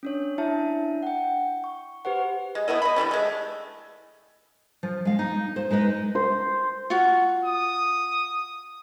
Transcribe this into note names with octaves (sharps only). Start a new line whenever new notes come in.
C#4 D4 C#5
D4 E4 E5 A5
F#5 G5
C#6
G4 B4 C5 F#5
G#3
A3 B3 E4 D#5
D#5 B5
D3 E3 G3 C#4
G#3 A3
F3
G#3 F5
D#4
C5
G#3 D#4 B4 D#5
C5
F4 F#4
D#6